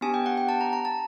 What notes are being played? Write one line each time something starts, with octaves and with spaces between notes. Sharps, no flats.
B3 D4 G4 G#5
G5
F#5
G5
A5
A#5
A#5
A5